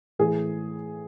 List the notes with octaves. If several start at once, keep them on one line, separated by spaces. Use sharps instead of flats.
A2 E3 G#4